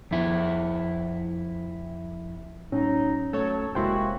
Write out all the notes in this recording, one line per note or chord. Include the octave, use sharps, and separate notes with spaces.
F2 E4
A2 F#3 C#4 D#4
F#3 A3 A4 C#5
F1 C3 G#3 A#3 E4 F#4 G5 C6